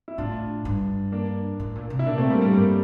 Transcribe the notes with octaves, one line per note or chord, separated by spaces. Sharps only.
E4
A2 D4 F4
G2
A#3 D4
A2
A#2
C3
E4
A#2 A#3 D4
A3 C4
A2 G3 A#3
G3 A#3
G2 G3 A#3